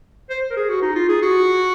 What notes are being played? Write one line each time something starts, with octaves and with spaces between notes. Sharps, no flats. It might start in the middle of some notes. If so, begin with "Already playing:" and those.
C5
A#4
G#4
F#4
D#4
F4
G#4
F#4